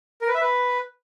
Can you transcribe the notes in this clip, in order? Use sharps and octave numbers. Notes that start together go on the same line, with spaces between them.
A#4
B4
E5
B4